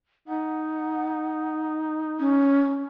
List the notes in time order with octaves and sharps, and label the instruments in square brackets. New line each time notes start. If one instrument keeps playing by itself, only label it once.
[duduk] D#4 [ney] F#5
[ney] C#4